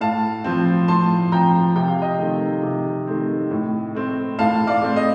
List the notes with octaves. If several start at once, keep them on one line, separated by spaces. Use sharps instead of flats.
A2 F5 A5
F3 C4
A2 A5 C6
F3 C4 G5 A#5
C3 G5
F5
D#5 G5
D#3 A3 C4
C3
D#3 A3 C4
A2
A3 C4
A2 F5 A5
D5 F5
A3 C4
D#5